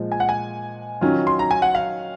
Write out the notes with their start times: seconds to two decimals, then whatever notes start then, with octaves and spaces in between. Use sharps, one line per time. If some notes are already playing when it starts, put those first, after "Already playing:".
Already playing: A#2 F3 G#3
0.12 G#5
0.20 F#5
0.29 G#5
1.01 D#3 F#3 C#4 F4
1.27 C6
1.39 A#5
1.51 G#5
1.62 F#5
1.75 F5